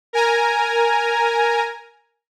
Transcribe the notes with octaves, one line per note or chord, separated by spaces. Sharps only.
A#4 G#5 A#5